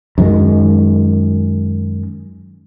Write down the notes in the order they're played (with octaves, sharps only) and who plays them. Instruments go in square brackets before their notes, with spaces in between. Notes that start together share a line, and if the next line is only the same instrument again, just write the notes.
[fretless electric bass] F#2 D#3 G#3